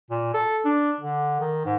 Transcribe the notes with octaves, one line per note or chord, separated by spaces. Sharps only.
A#2
A4
D4
D3
D#3
G#2